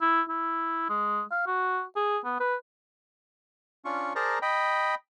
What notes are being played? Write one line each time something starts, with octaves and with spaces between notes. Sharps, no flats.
E4
E4
G#3
F5
F#4
G#4
B3
B4
C#4 D4 F4 C#6
G#4 A#4 C5 D5 A5 A#5
D#5 G5 B5